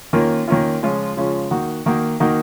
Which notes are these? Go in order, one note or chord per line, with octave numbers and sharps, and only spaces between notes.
D#3 A#3 C#4 F4
D#3 A#3 C#4 F4
C#3 F3 G#3 C#4 F4
C#3 F3 G#3 C#4 F4
D#3 A#3 D#4 F#4
D#3 A#3 D#4 F#4
D#3 A#3 D#4 F#4